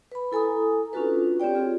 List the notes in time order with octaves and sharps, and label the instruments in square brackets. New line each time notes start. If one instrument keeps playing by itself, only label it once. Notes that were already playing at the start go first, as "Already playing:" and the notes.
[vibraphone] B4 B5
E4 A4 G#5 A#5 D#6
C#4 D4 F4 F#4 A4 B4
C4 G4 C#5 D5 G5
F4 G#4